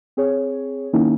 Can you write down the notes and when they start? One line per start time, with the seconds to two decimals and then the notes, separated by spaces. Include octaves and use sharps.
0.17 C4 G#4 C#5
0.93 D#3 A#3 C#4 D#4 E4